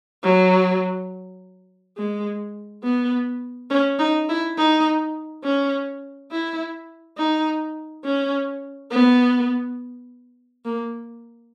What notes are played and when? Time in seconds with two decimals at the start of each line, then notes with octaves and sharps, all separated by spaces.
0.23 F#3
1.97 G#3
2.83 B3
3.70 C#4
3.99 D#4
4.29 E4
4.57 D#4
5.44 C#4
6.31 E4
7.17 D#4
8.04 C#4
8.91 B3
10.65 A#3